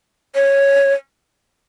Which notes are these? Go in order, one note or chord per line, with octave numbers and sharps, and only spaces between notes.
C#5